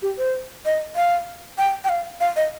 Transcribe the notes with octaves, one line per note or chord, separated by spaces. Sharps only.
G4
C5
D#5
F5
G5
G5
F5
F5
D#5